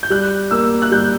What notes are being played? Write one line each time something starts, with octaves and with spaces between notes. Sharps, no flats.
G6
G3 F#6
A#3 E6
F#6
G3 G6